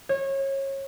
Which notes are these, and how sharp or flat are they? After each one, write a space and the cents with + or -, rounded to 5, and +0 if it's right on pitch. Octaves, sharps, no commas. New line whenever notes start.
C#5 -25